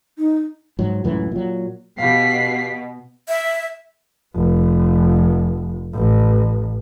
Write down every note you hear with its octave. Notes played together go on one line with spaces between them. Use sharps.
D#4
G#2 F#3
C#2 F#2 A2 E3
A#2 F#3
B2 G4 F5 B6 C7
E5
F1
A1